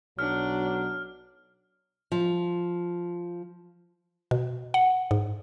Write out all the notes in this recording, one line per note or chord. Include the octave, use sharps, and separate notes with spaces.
B1 F#3 D4 F6
F3
B2
F#5
G#2